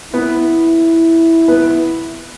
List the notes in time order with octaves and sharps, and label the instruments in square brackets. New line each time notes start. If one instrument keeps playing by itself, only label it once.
[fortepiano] B3 B4 [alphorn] E4
[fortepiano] B3 B4